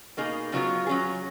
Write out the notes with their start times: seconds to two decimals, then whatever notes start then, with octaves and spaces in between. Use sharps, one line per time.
0.17 B2 A#3 D#4 G#4
0.52 C#3 F#3 B3 F4
0.86 F#3 C#4 G#4